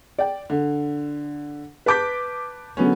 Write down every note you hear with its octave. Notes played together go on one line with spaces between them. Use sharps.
D5 G5
D3
B4 A5 D6 G6 B6
D3 F#3 B3 C#4